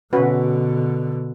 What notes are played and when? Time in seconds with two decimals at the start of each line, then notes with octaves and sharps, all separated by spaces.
0.13 B2 D3 C#4 F#4 B4